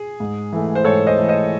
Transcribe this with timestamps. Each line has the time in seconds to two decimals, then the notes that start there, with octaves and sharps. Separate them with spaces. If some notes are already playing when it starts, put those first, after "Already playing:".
Already playing: G#4
0.20 G#2
0.52 E3 A3
0.75 C5
0.85 G#2 A4 C#5
1.07 C5 D#5
1.18 E3 A3
1.29 C5 D#5